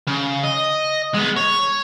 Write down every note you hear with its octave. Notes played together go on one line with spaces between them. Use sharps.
C#3
D#5
G#3 B3
C#5